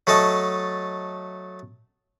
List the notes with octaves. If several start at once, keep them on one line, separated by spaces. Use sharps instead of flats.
F#3 A3 A4 D#5 A5